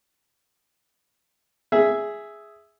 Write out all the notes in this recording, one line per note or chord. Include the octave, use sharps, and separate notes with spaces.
G#4 E5